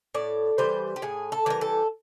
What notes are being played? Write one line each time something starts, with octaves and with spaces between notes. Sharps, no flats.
A2 D5
E3 G3 C5
G4
A2 G#4
A4
E3 G3 A#4
A4